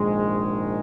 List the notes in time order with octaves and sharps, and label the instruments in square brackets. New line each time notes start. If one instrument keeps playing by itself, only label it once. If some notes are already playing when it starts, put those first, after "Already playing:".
Already playing: [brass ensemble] A#1 G#2 D#3 G#3